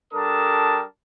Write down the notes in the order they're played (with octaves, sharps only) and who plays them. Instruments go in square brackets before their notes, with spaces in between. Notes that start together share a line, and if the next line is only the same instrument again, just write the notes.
[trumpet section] G3 D4 A4 A#4 A5 D#6